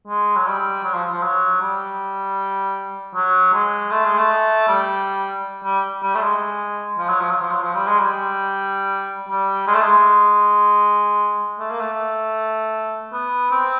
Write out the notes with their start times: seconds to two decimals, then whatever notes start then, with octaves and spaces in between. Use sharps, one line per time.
0.08 G#3
0.36 F#3
0.47 G3
0.84 F#3
0.94 F3
1.12 F3
1.23 F#3
1.62 G3
3.15 F#3
3.53 G#3
3.91 A3
4.05 G#3
4.19 A3
4.68 G3
5.64 G3
6.03 G3
6.15 A3
6.22 G#3
6.99 F3
7.09 F#3
7.20 F3
7.31 F#3
7.42 F3
7.51 F#3
7.63 F3
7.75 G3
7.88 G#3
7.99 G3
9.29 G3
9.67 G#3
9.74 A3
9.82 G#3
11.60 A3
11.70 A#3
11.80 A3
13.13 B3
13.51 C4